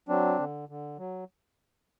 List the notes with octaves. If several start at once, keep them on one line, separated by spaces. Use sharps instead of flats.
F#3 C4 D4
D3
D3
F#3